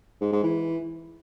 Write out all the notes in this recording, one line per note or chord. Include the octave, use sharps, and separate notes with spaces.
G#2
G#2
E3